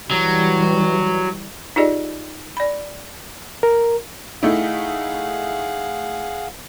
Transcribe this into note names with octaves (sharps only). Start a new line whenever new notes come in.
E3 F#3 G3
D#4 F4 G4 G#4 D5 D#5
D5 B5
A#4
A3 D#4 E4 G#4 F5 F#5